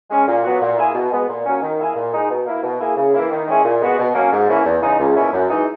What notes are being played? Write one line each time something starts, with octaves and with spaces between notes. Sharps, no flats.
G#3 C#4
A#2
F#3 B3 F#4
A#2
A#3 E4 G#4
B2
G#3 B3
A#2
F#3 A#3 C#4
D#3
A#3 E4 G#4
A#2
G#3 D#4
B2
A#3 E4
B2
A#3 E4 G#4
C#3
E3 A#3 E4
D#3
G#3 C#4 E4 G#4
A#2
G#3 B3 F#4
B2
F#3 A#3 C#4
G#2
E3 A#3 C#4 E4
E2
C#3 E3 G#3 D#4
C#2
B2 A#3 C#4 E4
F#2
E3 G#3 D#4